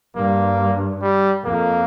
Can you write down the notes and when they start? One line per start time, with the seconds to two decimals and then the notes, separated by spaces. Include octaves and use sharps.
0.16 G2 A#3
1.02 G3
1.45 F2 A#3